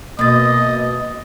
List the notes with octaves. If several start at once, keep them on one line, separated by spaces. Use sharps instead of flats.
B2 A#3 D#5 A6